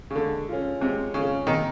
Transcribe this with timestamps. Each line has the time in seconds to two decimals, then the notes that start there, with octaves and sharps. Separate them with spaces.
0.11 C#3
0.16 D3 G#3
0.48 C#4 F4
0.81 C3 G#3
1.14 C#3 C#4 F4
1.47 C3 D#3